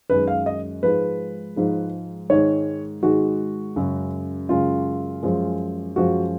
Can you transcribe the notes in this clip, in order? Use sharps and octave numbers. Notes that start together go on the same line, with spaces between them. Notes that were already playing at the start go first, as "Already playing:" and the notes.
F#2 D#3 G#3 B4
F5
D#5
G#2 F3 G#3 B4
G#2 F3 G#3
G#2 D#3 G#3 C#5
G#2 D#3 G#3 F#4
F#2 C#3 G#3
F#2 C#3 G#3 F4
F#2 F3 G#3
F#2 F3 G#3 F#4